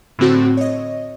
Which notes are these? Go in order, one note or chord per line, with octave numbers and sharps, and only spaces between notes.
A2 D3 C4 F#4
C#5 D#5